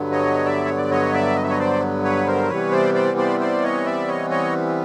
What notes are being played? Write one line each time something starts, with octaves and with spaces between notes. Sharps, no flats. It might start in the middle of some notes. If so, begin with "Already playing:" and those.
Already playing: G2 D3 F#3 B3
C#5 D#5
D5 E5
C#5
D5
C#5 D#5
D5 E5
D#5
E5
C#5 D#5
C5 D5
B4 C#5
A#4 C5
C3 E3 G3 B3 B4 C#5
C5 D5
C5 D5
C5 D5
C5 D5
C#5 D#5
D5 E5
C#5 D#5
C#5 D#5